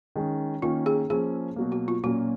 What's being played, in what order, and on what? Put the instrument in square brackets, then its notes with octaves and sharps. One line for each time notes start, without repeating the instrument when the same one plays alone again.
[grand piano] D#3 G#3 C#4
[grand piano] D#3 A#3 C#4 [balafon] F4
[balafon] G#4
[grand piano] F3 A#3 C#4 [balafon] G#4
[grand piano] B2 F#3 A#3
[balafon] F#4
F4
[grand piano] A#2 F#3 A#3 C#4 [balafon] F#4